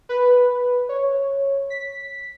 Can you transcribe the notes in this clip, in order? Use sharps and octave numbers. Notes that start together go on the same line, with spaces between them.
B4
C#5
B6